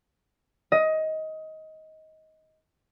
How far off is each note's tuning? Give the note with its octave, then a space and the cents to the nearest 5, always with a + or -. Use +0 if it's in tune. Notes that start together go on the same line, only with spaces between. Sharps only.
D#5 +20